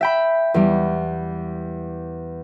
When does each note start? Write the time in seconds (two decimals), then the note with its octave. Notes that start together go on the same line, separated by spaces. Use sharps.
0.01 E5 G5 B5
0.54 E2 G3